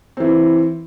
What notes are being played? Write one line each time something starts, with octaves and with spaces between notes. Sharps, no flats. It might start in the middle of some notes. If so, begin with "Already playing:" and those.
E3 C4